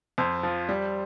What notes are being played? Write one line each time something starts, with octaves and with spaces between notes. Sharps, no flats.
F2 C5
F3
G3